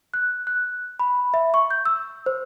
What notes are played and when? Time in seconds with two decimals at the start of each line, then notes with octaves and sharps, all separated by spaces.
0.14 F#6
0.47 F#6
1.00 B5
1.34 E5
1.54 C#6
1.70 G6
1.85 E6
2.26 C5